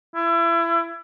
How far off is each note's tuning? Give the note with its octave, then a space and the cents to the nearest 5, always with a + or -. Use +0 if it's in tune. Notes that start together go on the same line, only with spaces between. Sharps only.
E4 +30